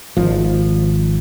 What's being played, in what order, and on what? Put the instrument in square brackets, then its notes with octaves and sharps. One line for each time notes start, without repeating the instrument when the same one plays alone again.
[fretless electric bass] G#1 F3